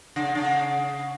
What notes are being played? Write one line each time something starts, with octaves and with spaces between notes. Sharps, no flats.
C#3
C#3